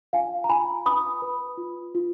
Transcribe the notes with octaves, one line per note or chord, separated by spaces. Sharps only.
F4 F5 G#5
A#5
F4 G#5 B5
B4 B5 D#6
B4
F4
F4